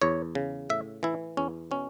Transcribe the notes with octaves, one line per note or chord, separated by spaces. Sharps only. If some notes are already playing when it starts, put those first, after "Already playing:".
E2 C#5
C#3
A2 E5
E3 E4
E2 C#4
B2 C#4